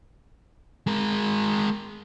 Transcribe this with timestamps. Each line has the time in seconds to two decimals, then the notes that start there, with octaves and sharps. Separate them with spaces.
0.87 G#3 A#4